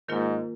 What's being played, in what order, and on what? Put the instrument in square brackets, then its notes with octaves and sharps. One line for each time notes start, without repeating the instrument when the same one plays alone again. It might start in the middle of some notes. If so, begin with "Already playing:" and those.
[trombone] G#2 [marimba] D#3 A#3 F4 A#4